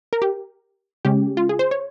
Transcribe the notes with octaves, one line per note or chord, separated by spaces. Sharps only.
A#4
G4
C#3 G#3 C#4 G4
F4
G#4
C5
C#5